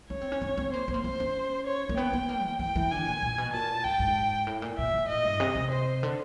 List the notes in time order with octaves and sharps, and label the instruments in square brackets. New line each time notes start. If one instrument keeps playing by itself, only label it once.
[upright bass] C#4 [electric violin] C#5
[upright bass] C4
C#4
C4
C4
[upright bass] A#3 [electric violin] C5
[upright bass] B3
A#3
[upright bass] C4 [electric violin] C5
[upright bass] C#4
[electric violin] C#5
[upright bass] A#3
[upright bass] B3 [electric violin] G5
[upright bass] B3
A#3
E3
[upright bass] E3 [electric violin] G5
[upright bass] E3
[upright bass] D3 [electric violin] G#5
[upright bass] A#2
A#2
B2
[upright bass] A#2 [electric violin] A5
[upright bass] G#2 [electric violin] G5
[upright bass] G#2
A2
A#2
[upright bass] A#2 [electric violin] E5
[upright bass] A#2
[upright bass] A2 [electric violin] D#5
[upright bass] G2
C3
C3
[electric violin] C5
[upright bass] D3